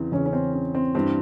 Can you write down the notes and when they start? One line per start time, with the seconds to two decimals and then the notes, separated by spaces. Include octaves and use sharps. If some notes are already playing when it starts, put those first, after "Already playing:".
Already playing: E2 C#3 E3 C4
0.12 E2 C#3 E3 C#4
0.26 C#4
0.33 C4
0.53 C#4
0.75 C4
0.95 G2 E3 C4